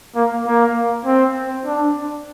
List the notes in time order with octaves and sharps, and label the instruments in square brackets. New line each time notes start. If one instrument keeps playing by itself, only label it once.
[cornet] A#3
A#3
C4
D4